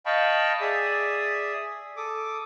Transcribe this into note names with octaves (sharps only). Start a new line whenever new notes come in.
D#5 F5 G5 A5 B5 C#6
G#4 D5 E5 D#6
A4 D6 D#6